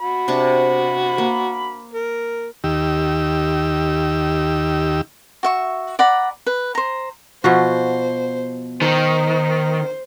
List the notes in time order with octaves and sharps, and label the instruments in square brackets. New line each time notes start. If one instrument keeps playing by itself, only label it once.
[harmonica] F#4 B5
[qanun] C3 D4 C#6
A#3
[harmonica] A#4
[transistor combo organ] D#2 D#3 G4 E6
[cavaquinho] F#4 E5 C#6
D5 F#5 A#5 B5
B4
C5 A#5
[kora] B2 F3 F#4 [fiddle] C5
[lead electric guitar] D#3 [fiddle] C5